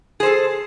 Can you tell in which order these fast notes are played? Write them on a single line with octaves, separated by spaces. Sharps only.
G#4 C5 A4